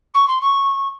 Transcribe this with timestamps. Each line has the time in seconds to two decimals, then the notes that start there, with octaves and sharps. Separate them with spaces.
0.14 C#6
0.27 C6
0.41 C#6